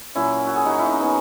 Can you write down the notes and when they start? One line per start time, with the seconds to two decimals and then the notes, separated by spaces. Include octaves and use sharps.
0.15 A#2 F#3 C#4 E4
0.47 F#4
0.56 G#4
0.65 D#4 F#4
0.79 E4
0.86 D#4
0.93 C#4
1.00 B3 D#4